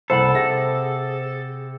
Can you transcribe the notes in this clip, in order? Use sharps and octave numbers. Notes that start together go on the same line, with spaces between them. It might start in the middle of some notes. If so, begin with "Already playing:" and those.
F#1 C2 A4 C5 F#5 B5
C3 G#4 A#6